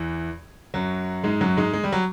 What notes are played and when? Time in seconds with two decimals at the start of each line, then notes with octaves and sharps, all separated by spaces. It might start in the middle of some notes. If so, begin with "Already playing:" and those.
Already playing: E2 E3
0.74 F#2 F#3
1.24 G#2 G#3
1.41 F#2 F#3
1.57 G#2 G#3
1.73 G#3
1.84 G3
1.93 F#3